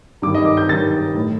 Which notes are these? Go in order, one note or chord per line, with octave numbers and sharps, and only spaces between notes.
G2 D#3 D6
D#5
D6
G6
G2 D#3 A6
A2